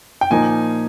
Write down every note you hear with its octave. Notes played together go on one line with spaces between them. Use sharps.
G5
A#2 F3 A#3 D#4 G#5